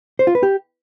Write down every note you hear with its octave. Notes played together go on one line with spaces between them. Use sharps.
C5
F4
B4
G4